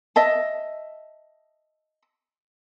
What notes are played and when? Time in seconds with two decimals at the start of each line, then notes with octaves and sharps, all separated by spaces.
0.16 D#5 E5 A5